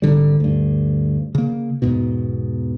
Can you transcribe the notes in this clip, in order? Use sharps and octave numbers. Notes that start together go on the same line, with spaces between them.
G#1 D3 G3
D2 G2
C#3 A#3
E2 G#2 B2